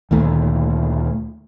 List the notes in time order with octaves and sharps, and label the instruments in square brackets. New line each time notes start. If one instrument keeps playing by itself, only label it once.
[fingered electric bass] D2 A#2 D#3 A3